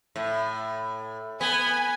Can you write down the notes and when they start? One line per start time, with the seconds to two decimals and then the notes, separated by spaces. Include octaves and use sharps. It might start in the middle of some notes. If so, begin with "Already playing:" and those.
0.16 A2
1.41 B3 G#5